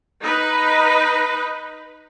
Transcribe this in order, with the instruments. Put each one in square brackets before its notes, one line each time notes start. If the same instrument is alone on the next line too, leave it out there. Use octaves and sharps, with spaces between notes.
[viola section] D#4 B4